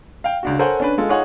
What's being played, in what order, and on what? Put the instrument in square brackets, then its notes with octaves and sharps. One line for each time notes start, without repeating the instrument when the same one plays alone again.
[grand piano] F5 G5
C#2 D4 F#4
A4 A#4 C5 C#5 F#5 G#5
C#4 D4 B4
G#3 F4 A4
D#4 F4 G#4 C#5 F#5 G#5